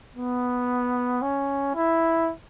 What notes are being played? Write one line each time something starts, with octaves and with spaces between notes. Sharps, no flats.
B3
C#4
E4